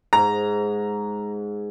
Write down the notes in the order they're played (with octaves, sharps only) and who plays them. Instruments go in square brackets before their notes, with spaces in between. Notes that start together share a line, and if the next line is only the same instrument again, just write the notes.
[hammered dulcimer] G#2 [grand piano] A#5